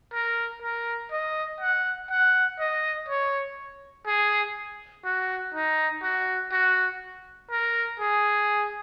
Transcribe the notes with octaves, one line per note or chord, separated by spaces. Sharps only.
A#4
A#4
D#5
F#5
F#5
D#5
C#5
G#4
F#4
D#4
F#4
F#4
A#4
G#4